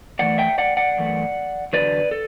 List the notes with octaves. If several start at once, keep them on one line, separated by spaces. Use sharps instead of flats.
F#2 E3 A3 D5 F#5
E5 G5
D5 F#5
D5 F#5
F#2 E3 A3
E2 D3 F#3 B4 D5
A4